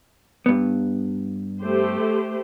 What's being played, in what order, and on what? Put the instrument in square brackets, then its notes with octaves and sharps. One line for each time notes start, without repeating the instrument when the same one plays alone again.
[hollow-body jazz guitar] G2 B3
[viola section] A3 G4 C5